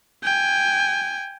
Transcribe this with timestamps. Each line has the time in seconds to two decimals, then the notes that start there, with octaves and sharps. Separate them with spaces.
0.24 G5 G#5